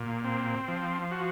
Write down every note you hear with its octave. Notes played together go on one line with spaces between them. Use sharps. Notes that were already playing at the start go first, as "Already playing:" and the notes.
Already playing: A#2
C4
F3
F#4